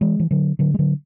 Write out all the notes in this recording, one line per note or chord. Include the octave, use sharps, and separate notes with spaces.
E3 G#3
E3
D3 F#3
D3 F#3
G#3
D3 F#3